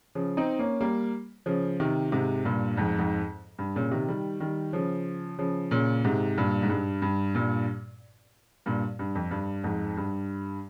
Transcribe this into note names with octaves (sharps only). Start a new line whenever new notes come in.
C#3 F3
C4 D#4
A#3 C#4
G3 A#3
C#3 F3
C3 D#3
G#2 C3
G2 A#2
F2 G#2
F2 G#2
G2
A#2 C#3
C3 D#3
D#3 G3
D#3 G3
C#3 F3
C#3 F3
A#2 C#3
G#2 C3
G2 A#2
G#2
G2
G2
G2 A#2
G2 A#2
G2
F2
G2
F2 G#2
G2